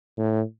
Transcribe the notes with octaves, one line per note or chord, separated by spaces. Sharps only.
A2